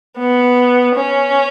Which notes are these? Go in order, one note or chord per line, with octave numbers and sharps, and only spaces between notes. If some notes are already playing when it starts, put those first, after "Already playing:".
B3
C#4